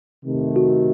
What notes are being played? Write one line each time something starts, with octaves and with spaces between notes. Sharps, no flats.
C3 D#3 A3
F#4